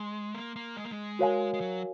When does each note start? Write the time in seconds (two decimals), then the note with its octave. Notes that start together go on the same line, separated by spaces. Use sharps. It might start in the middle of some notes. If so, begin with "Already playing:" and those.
Already playing: G#3 C6
0.35 A#3
0.56 A#3
0.77 G#3
0.84 A#3
0.92 G#3
1.19 F#4 A#4 C#5 F5 G#5
1.54 G#3
1.61 F#3